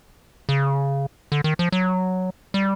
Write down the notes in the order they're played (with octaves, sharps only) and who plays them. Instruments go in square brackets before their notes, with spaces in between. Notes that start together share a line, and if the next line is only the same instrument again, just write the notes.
[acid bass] C#3
D3
D#3
F3
F#3
G3